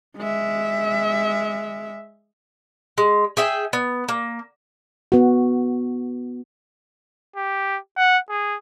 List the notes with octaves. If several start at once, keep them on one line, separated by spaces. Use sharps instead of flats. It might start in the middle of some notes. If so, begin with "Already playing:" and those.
G#3 E5
G#3
G#4 E5 G5
B3
A#3
B3 F#4
G4
F#5
G#4